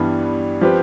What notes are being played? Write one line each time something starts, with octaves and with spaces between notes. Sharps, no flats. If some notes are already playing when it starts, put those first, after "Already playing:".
Already playing: G2 E3 G3 B3 D4
F3 C4 G4 B4